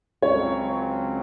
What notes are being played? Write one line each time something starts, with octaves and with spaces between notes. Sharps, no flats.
C#2 C#3 F#3 C4 C#5